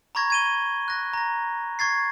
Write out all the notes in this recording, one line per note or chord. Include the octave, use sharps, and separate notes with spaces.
A#5 B5 C#6 G#6 A#6
G#6 D#7 G7
F#6 A#6
A#5 A#6
C#6 G#6 A6 C7